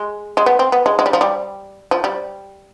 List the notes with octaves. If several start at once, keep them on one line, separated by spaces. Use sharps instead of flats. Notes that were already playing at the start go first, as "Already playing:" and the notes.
Already playing: G#3
G#3
B3
C4
B3
G#3
G#3
G3
F3
G3
F3
G3